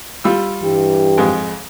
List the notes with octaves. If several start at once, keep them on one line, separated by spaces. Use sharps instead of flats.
G3 F4 E6
G2 E3 G4
F2 G#2 G#3